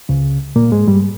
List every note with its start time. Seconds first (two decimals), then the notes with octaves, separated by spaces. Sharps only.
0.09 C#2 C#3
0.56 A#2 A#3
0.72 G#2 G#3
0.87 G2 G3